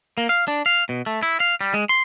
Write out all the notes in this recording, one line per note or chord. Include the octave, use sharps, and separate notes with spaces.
A#3
F5
D4
F5
B2
A3
E4
F5
G3
G#3
C6